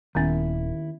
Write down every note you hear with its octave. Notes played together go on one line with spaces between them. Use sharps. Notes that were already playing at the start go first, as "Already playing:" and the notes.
D#1 D#2 D#3 B3 C#4 E4